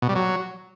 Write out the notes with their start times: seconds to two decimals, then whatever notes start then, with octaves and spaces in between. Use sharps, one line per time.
0.02 B2
0.09 G3
0.16 F#3